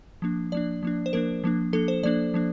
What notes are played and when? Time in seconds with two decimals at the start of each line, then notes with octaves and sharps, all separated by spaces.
0.22 F3 A#3 D4
0.52 F3 A#3 D4 D5
0.83 F3 A#3 D4
1.06 C5
1.13 F3 A#3 D4 A#4
1.44 F3 A#3 D4
1.73 F3 A#3 D4 A4
1.88 C5
2.03 F3 A#3 D4 D5
2.34 F3 A#3 D4